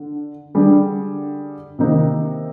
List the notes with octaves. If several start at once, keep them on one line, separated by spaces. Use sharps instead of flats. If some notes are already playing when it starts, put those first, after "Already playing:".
Already playing: D3
D3 G3 D4 G#4
C3 D#3 A#3 D#4